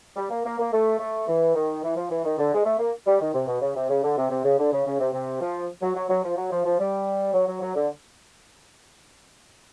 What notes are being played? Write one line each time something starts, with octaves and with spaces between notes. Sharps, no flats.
G3
A#3
A#3
A#3
A3
A3
E3
D#3
E3
F3
E3
D#3
D3
G#3
A3
A#3
G3
D#3
C3
B2
C#3
C3
C#3
D3
C3
C3
C#3
D3
C#3
C#3
C3
C3
F3
F#3
F#3
F#3
F3
F#3
F3
F3
G3
F#3
F#3
F#3
D3